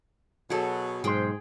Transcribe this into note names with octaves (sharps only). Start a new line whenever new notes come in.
B2 F#3 G#4 A4
B1 G#2 G#4 C5 G5